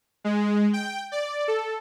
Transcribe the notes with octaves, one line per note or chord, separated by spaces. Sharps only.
G#3
G5
D5
A4